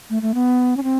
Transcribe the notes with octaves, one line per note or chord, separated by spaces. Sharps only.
A3
A3
B3
C#4
C4